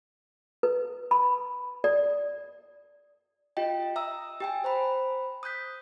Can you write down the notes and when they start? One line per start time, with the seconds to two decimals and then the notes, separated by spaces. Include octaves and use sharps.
0.63 B4
1.11 B5
1.84 D5
3.57 F4 G4 D#5 G5
3.96 E5 A#5 D#6 E6
4.40 G4 G5 G#5
4.64 C5 A#5 B5
5.43 D#6 F#6 G6 B6